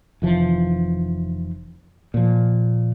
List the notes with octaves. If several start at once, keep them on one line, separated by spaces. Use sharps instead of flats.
F1 E3 F3
A#2 F3